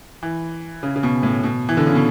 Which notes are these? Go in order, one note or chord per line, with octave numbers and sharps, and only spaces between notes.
E3
C#3
C#3
B2
A2
B2
E3
D3
C#3
B2